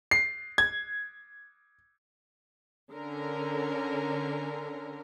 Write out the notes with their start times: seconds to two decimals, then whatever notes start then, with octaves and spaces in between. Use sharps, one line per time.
0.11 C7
0.58 G#6
2.92 D3 C#4 A#4